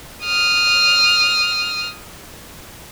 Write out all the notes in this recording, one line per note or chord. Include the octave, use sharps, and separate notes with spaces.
D#6 F6